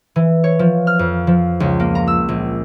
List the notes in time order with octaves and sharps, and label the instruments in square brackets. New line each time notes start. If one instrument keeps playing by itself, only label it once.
[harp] E3
C#5
F3
F6
F2
F3
C#2
A#3
A#5
E6
A#1